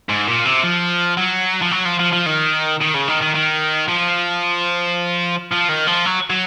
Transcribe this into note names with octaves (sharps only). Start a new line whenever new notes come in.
G#2
A#2
C3
F3
F#3
F3
F#3
F3
F3
F3
D#3
D#3
C#3
D#3
D#3
D#3
F3
F3
D#3
F3
F#3
F#3